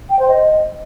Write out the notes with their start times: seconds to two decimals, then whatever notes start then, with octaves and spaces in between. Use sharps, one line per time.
0.10 G5
0.19 C5
0.28 D#5